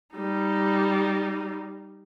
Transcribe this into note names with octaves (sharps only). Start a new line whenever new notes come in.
G3 D#4